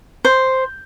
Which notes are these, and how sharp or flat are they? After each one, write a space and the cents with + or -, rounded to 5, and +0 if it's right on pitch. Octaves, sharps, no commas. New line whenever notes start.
C5 +0